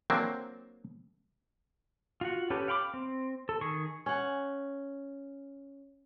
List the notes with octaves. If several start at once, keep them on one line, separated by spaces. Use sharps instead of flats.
F#3 A#3 C4 D4
F4 F#4 F#5
C#4 G4 A4 B4
F5 G5 B5 C#6 D6
C4
A4
D#3 G#4 C#6
C#4 F#5